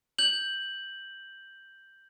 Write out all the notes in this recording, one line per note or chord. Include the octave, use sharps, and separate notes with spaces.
G6 F#7